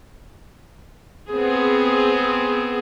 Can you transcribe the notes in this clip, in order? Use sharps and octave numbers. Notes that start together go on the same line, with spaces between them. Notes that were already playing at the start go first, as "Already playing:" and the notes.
B3 C4 G#4